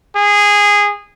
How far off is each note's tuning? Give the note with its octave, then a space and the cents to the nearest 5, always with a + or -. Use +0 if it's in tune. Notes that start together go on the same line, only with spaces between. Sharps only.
G#4 -15